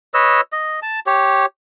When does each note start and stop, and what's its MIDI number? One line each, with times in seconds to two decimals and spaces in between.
0.14 0.41 71
0.14 0.41 73
0.14 0.41 75
0.14 0.41 88
0.52 0.80 75
0.82 1.00 81
1.07 1.46 67
1.07 1.46 73